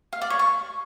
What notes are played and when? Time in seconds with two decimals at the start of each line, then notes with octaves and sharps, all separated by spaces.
0.13 F5
0.21 D5
0.30 C#5
0.39 C#6